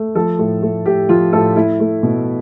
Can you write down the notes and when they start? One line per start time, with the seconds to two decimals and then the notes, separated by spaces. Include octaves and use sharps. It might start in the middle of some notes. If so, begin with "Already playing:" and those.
Already playing: A3
0.15 F3 A4
0.39 A2
0.62 A3
0.86 A2 G4
1.09 F3 F4
1.33 A2 A4
1.56 A3 E4
1.80 A3
2.03 B2